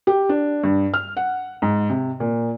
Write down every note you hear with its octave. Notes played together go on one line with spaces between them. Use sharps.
G4
D4
G2
F6
F#5
G#2
C3
A#2